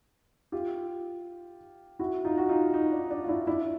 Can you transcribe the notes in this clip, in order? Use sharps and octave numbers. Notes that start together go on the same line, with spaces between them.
F4 G4
E4 F#4
D#4 F4
F#4
D#4 F4
D#4
D4
D4
F4
D4 E4
D4 E4